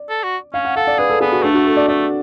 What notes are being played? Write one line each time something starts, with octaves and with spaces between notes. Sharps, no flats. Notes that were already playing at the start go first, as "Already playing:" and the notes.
Already playing: D5
A4
F#4
C#4 F5
F#5
A4 F5
D5
G#4 B4
A4
B3 G#4
F#4
A3 D4
F#4
A4
D5
A3 D5